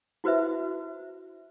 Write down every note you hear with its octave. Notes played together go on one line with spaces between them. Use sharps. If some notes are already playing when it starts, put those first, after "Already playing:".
E4 F#4 B4 C5 E5